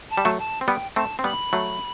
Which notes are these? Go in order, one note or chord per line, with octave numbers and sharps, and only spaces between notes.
A5
G3
F#3 A3
A5
C4
G3 B3 G5
A3 C4 A5
C4
G3 B3 B5
F#3 A3